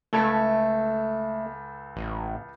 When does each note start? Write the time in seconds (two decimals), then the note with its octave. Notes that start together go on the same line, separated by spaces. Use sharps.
0.13 C#2 A3 A4 G#6
1.96 A1